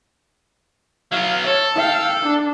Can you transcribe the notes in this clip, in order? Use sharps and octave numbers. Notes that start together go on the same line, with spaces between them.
F#3 B3 F5
A4 C#5
F5 G5
D4